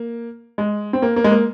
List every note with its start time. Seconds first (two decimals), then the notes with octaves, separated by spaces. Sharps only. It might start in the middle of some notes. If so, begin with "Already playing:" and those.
Already playing: A#3
0.58 G#3
0.93 C4
1.02 A#3
1.16 A#3
1.24 G#3
1.31 A#3